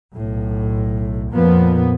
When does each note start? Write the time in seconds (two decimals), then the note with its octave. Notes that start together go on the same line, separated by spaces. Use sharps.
0.15 B1 A2
1.34 F2 A#2 F3 A#3 B3